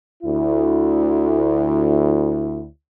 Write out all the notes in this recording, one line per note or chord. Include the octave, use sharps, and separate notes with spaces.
D2 E4